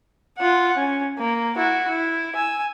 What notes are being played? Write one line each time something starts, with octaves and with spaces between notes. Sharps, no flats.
F4 F#5
C#4
A#3
E4 F#4
E4
G#5 E6